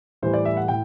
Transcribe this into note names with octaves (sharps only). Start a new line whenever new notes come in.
A2 E3 G3 C5
D5
E5
F#5
A2 G5